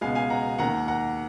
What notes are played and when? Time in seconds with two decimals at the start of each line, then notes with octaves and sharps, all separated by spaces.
0.01 C#2 B2 G#3 B3 F5 G#5
0.15 F5 G#5
0.30 F#5 A#5
0.58 D#2 D#3 A#3 F#5 A#5
0.88 F#5 A#5